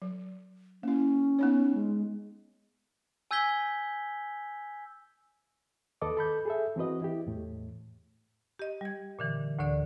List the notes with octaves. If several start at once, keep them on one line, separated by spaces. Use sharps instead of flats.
F#3
A#3 C#4 E4
B3 D#4 C#5
G#3
G#5 E6 G6 G#6 B6 G7
D#2 A4 B4 D#5 D6
A4 B5 G6
G#4 A4 E5
E3 C4 F#4 B4 D#5
E4 G4
E2 A2
G4 D#5
G3 G#6
A#2 D3 E3
D2 A2 D3 D5